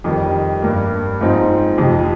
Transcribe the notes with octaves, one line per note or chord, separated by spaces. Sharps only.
F2 D#3 G3
G2 G3 A#3
G#2 F3 C4 D#4
F2 C3 F3